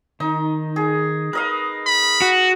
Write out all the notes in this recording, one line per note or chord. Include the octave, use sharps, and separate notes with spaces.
D#3 D#4
G#4
A#4 B4 D#5 F5
B5
F#4